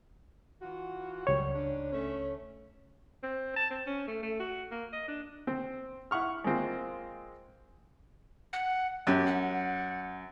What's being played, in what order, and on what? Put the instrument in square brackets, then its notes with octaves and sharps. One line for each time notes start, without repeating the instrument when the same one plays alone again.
[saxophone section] E3 F4 F#4
[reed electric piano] C#2 C#5 [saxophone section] F#2 G3
[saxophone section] G#2 C#4 D4
A3 C#4
[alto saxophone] C4
A5
C4
C#4
A3
A3
F#4
A#3
D#5
D4
[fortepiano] C4
E4 F#5 C#6 F6
G#3 A#3 C4 F4
[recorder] F#5
[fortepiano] F#2 [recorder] G4
[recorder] F#5